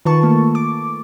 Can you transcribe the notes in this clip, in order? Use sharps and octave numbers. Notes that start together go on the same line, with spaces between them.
D#3 F4 B4 A5 C#6
A3 A#3
D6